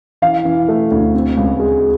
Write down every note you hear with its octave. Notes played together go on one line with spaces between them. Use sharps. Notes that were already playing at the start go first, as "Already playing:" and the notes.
E3 F5
E3
A3
D2
C4
C#2
G#3